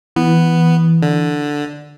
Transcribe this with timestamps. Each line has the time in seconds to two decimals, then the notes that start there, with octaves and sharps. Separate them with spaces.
0.16 E3 B3
1.02 D3